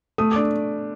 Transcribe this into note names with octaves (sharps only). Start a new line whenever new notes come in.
A3 D#6
D6
D4